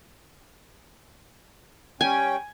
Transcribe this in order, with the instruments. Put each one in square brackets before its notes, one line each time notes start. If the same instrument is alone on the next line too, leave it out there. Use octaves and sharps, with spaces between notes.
[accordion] G3 C#4 G5 [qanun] G#5